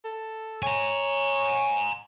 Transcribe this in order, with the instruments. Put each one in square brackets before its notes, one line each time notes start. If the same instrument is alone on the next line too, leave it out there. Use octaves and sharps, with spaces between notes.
[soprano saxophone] A4
[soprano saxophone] C#5 [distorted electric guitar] G#5 A#5